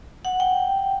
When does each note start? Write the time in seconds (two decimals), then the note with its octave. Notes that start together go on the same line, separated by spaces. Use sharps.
0.25 F#5
0.40 G5